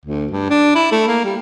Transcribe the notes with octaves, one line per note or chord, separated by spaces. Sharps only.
D2
G2
D4
E4
A3
A#3
G3